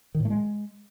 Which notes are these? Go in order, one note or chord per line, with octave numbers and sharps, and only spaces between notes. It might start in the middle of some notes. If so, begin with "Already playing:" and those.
D#3
A2
A3
G#3